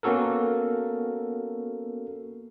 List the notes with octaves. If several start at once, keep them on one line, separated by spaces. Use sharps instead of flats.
A#3 B3 C#4 F#4 A4 A#4